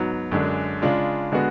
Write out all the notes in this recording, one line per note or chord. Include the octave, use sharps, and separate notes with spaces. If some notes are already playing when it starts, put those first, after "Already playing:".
Already playing: G#2 F#3 B3
F#2 D3 G#3 D4
C#3 G#3 D4 F4
D3 G#3 B3 F#4